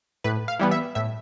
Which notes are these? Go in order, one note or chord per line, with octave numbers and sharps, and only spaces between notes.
A2 B4
F5
E3 G3 B3
E5
A2 E5